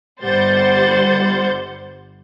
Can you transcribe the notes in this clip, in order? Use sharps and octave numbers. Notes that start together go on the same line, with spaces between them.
G1 G3 C5 F#5 G6 A6